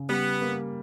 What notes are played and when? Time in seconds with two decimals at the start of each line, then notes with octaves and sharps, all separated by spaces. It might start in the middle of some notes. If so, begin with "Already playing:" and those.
Already playing: C#3
0.09 G3 B3
0.42 A#3